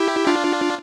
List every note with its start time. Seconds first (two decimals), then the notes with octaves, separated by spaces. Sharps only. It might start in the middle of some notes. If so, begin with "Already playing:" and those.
Already playing: E4 G4
0.27 D4 F4